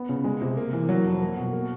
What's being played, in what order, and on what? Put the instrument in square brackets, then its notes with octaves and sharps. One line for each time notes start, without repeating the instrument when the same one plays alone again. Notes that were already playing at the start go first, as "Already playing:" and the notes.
Already playing: [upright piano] B3
C#3
G#3
C3
A#3
E3
F#3
F2
A#3
B2
A#3